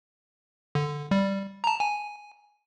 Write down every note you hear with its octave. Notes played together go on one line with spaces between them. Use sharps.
D3
G3
A5 A#5
G#5